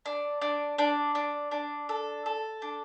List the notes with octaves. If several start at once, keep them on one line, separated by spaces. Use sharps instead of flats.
D4
D4
D4
D4
D4
A4
A4
D4